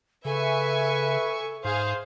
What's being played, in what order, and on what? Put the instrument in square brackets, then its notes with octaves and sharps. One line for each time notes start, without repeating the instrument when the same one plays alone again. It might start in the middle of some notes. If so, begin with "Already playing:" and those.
[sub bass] C#3 [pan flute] A4 [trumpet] B4 [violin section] E5 G#5 C#6
[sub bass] G#2 [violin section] G#4 F5 [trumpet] C5